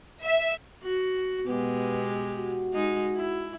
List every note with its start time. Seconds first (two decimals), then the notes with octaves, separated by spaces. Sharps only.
0.22 E5
0.83 F#4
1.46 B2 G#3 B3 G4
2.37 F#4
2.73 G#3 D#4
3.15 E4